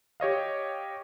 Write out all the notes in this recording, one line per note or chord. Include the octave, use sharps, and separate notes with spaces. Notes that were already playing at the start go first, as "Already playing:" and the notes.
G4 C#5 D#5 F5